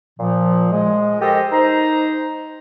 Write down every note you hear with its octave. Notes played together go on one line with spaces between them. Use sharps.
A#2 F3
G#3
G4 A4 A#4 C5 D#5
D#4 C5 A#5